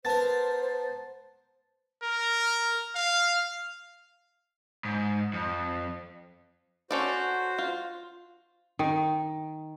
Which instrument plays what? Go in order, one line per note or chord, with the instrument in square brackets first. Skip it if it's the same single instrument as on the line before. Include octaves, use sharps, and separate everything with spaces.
[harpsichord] B3 A#4 [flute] C5 [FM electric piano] A5 A6
[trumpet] A#4
F5
[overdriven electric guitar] G#2
F2
[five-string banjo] C#4 A4 D5 [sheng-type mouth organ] F#4 C5
[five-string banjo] F4
[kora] D#3